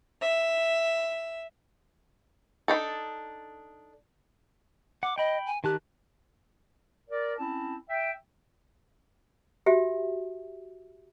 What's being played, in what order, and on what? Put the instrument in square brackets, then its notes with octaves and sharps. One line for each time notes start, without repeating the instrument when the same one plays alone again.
[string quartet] E5
[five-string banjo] D4 D#4 A4
[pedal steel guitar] F#5 [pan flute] D6
[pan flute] D#5 [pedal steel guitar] G5 B5
[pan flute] G#5
[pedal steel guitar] D#3 A5 F#6 [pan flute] G4
[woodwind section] A#4 D5
C4 C#4 E4 A5
E5 G5
[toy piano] F#4 G4 E5